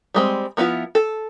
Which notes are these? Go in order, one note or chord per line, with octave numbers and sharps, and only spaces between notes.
G3 G#3 C4
F3 B3 E4 F4
A4